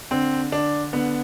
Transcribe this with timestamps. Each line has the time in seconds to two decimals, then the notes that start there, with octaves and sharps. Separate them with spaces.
0.11 D3 C4
0.52 D3 D4
0.93 D3 B3